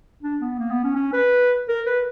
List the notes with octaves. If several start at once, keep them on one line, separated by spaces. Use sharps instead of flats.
D4
B3
A#3
B3
C#4
C#4
B4
A#4
B4